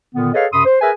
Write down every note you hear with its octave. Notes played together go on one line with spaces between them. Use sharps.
A#2 D3 D#3 B3
G#4 A4 B4 C#5 D#5 F5
F#2 C3 B5 C6 D#6
C5
G#4 A#4 B4 E5 G#5